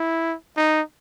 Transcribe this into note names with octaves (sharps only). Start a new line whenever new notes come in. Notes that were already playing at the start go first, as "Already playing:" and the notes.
Already playing: E4
D#4